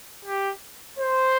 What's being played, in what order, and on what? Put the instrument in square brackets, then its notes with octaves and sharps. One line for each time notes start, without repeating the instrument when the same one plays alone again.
[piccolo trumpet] G4
C5